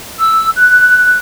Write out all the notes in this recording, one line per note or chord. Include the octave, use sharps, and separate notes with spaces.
E6
F#6